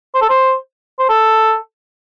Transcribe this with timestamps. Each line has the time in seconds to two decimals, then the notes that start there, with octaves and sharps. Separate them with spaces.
0.15 C5
0.21 A4
0.29 C5
0.99 C5
1.09 A4